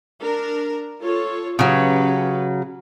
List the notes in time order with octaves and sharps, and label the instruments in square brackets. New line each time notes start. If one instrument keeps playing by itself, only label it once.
[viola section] D4 A#4
F4 A4 C#5
[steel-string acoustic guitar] C#3 F#3 [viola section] C#4 G4 B4